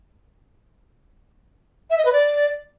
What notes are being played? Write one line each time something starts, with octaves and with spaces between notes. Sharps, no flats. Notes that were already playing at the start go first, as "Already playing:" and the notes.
E5
D#5
B4
D5